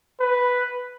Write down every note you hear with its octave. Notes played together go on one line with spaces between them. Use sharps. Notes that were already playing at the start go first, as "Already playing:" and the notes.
B4